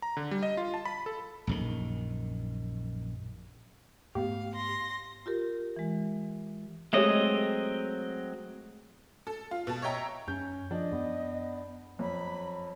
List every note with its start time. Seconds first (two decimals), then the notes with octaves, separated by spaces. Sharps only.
0.02 A#5
0.17 D3
0.31 G3
0.43 D#5
0.57 F4
0.74 A5
0.85 B5
1.06 A4
1.47 A#1 F#2 D#3
4.15 G#2 A3 B3 G4 F5
4.56 C6 A#6
5.26 F4 G4 A#4
5.76 E3 G#3
6.93 F#3 G#3 A3 C4 G4 C#5 D#5 E5
9.27 A4
9.51 F4
9.67 B2 A5
9.82 C#5 D#5 E5 G5 A#5
10.28 F#2 C#4 G6
10.71 F3 D4 D#5
10.92 F#2 B3
11.99 F2 F#3 B5